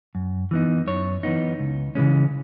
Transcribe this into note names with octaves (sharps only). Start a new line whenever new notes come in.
F#2
E3 B3 D#4
F#2 C#5
E3 B3 D#4
C#2
C#3 E3 G#3 C#4